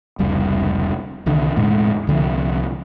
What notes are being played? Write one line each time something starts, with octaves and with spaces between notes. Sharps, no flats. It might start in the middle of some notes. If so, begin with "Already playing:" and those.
F1 C#2 G3
C2 D3 D#3
E1 A2 G#3
C2 D3 D#3 F3